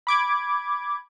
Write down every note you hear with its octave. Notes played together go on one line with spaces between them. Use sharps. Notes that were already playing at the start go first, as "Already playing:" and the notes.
B5 D6 G#6